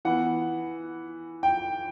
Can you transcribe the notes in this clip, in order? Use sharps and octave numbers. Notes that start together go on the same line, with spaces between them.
E3 B3 F#5
G5